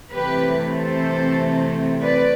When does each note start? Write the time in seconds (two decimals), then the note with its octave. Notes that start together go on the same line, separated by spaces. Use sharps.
0.12 C3 E3 A3 C4 G4 B4
0.76 A4 C5
2.03 B4 D5